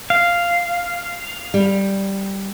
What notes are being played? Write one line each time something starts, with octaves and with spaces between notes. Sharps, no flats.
F5
G3